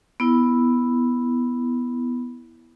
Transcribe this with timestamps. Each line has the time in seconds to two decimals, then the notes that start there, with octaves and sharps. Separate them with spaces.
0.20 B3 E4